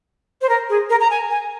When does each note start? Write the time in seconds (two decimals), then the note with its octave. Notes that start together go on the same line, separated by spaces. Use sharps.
0.42 C5
0.49 A#4
0.69 G#4
0.90 A#4
1.00 A#5
1.10 G#5
1.31 G#5